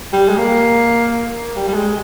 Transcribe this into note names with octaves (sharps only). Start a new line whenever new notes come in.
G3
G#3
A#3
G3
G3
G#3